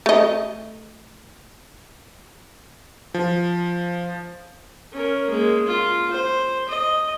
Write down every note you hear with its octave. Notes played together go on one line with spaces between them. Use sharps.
A3 D#5
F3
C#4 A#4
G#3 A#3
F4
C5
D#5